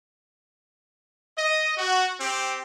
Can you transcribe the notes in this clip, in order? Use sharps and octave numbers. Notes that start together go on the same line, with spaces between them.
D#5
F#4
C4 G4